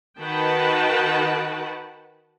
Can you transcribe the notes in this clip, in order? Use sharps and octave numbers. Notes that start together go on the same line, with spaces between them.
D#3 F#4 B4 F#5 G5 A5